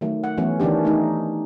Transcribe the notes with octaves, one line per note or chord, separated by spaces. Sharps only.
D#3 F#3 A3
F#5
E3 F#3 A3 B3 C#4
D#3 E3 C#4 D4 G4
A3 D#4